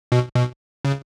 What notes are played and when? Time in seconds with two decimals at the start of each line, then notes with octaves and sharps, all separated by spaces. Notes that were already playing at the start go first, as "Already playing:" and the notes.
0.12 B2
0.36 B2
0.85 C#3